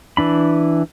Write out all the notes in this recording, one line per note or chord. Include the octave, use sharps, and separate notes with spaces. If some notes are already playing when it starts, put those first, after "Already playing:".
E3 D4 B5